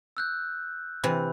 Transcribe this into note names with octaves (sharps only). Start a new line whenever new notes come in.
E6 F#6 G6
C3 E3 B5